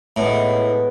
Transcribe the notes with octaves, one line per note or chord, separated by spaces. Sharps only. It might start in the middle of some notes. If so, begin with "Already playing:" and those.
A2 G#3 B3 D#5